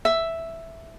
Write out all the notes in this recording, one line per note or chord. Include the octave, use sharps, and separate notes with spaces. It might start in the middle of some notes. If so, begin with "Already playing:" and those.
E5